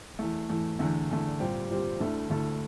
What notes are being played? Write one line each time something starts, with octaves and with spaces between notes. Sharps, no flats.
E2 E3 A3
E2 E3 A3
E2 D3 A3
E2 D3 A3
A#2 G3 C4 G4
A#2 G3 C4 G4
D2 D3 A3 E4 A4
D2 D3 A3 E4 A4